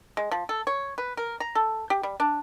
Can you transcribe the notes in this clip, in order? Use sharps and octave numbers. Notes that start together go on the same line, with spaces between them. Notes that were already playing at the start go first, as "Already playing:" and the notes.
G#3
F3
A4
C#5
B4
A#4
A#5
A4
G4
G3
D4